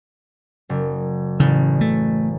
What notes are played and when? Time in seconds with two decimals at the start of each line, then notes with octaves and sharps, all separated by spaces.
0.69 F#1
1.40 A1 C#3
1.81 A3